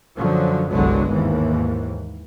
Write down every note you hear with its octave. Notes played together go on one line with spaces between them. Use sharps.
F#2 D3 F3 F#3
G1 C2 D3 F#3 G#3 B3
D#2 G#2 E3